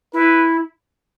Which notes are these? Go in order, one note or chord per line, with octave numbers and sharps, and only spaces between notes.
E4 B4